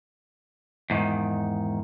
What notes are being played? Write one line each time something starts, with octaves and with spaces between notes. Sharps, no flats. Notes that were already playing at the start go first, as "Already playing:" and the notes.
E2 G#2 D#3